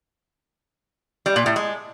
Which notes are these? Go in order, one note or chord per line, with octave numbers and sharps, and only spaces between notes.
G3
A#2
A2
G#3